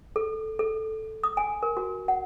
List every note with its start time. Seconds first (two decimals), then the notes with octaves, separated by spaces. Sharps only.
0.16 A4
0.59 A4
1.24 D#6
1.37 G#5
1.63 A#4
1.77 F#4
2.08 F#5